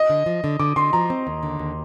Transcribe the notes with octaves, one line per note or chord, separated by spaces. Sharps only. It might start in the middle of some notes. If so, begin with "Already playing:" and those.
Already playing: D#5
D3
F3
D3
D3 D6
D3 C6
F3 A#5
C4
D#2
D3
D#2